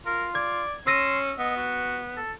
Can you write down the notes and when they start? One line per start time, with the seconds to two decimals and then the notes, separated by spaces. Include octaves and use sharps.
0.06 F4 A#4
0.35 D5 G#6
0.87 C#4 C6 E6 A#6 D#7
1.39 B3 D#5
1.57 F#4
2.17 A4